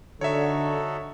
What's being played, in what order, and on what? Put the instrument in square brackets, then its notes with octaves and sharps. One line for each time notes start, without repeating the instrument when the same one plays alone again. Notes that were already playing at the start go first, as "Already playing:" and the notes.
[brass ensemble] D3 [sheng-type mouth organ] D#4 F#4 A4 [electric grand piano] C#5 E5